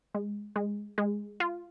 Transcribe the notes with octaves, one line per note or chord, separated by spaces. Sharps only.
G#3
G#3
G#3
F4